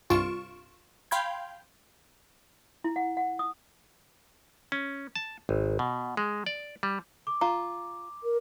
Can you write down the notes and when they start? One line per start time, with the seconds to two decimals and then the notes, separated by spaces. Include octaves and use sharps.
0.10 C2 G2 F4 C#6 D7 E7
1.11 F5 G5 B5 C6 G6 G#6
2.84 E4
2.96 F#5
3.17 F#5
3.39 D#6
4.72 C#4
5.15 A5
5.49 G#1
5.79 B2
6.17 G#3
6.46 D5
6.83 G3
7.27 D6
7.41 F4 A#5
8.23 A#4